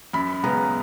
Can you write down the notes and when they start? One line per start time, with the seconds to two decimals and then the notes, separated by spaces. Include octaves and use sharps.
0.13 F#2 B5
0.44 C#3 G#3 B3 A#5